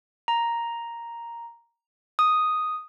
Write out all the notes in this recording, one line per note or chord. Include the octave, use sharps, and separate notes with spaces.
A#5
D#6